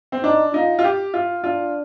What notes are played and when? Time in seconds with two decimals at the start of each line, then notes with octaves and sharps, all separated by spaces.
0.12 C4
0.23 D4 D#4
0.54 D#4 F4
0.79 F4
0.84 G4
1.14 F4
1.44 D4 F4